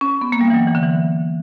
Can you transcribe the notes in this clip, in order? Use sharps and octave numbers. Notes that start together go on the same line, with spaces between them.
C#4
B3
A#3
G3
E3
F#3
E3
D3
E3